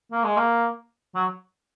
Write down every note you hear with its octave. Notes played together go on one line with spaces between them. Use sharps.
A#3
G#3
A#3
F#3